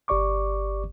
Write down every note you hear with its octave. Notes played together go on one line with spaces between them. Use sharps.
G1 G4 D5 C#6 D6